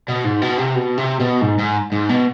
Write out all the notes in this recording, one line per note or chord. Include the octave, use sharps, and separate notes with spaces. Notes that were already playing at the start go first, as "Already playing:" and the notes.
B2
G#2
B2
C3
B2
C3
B2
G#2
G#2
G#2
B2